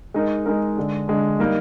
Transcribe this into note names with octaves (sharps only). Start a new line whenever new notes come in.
G#3 D#4 A#4
G#3 D#4 A#4
D3 G#3 D4
D3 G#3 D4
G3 A#3 D#4